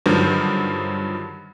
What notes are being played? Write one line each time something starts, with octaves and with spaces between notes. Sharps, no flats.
G2 D3 D#3 F3 F#3